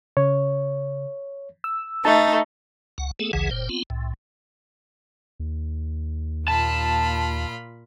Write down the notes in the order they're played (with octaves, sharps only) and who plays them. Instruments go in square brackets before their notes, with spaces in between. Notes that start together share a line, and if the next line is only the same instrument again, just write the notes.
[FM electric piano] C#3 [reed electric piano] C#5
[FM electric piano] E6
[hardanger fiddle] A3 [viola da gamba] D#4 [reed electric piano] A5
[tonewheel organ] C#2 F#5
A3 B3 G#4 A4
A1 D2 C#3 E3 G#4 F#5
F#1 A#2 C5 G5
B3 C4 F4
C2 A2
[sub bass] D#2
[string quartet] A#2 F4 B5 [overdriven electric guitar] A5